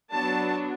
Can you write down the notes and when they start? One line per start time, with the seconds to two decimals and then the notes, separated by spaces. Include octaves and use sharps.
0.11 F#3 B3 D4 A5